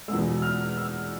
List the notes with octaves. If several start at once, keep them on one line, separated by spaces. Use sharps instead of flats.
E2 B2 G#3 E6
F6
E6